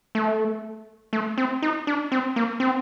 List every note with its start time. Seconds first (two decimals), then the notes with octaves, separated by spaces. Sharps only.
0.15 A3
1.13 A3
1.38 C4
1.62 D#4
1.87 D4
2.12 C4
2.36 A#3
2.60 C4